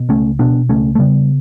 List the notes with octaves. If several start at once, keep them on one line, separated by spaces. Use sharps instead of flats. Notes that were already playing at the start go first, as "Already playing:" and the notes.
Already playing: B2
C#2 A3 C#4
B2 B3 D4
C#2 A3 C#4
A3
C#3 G3 B3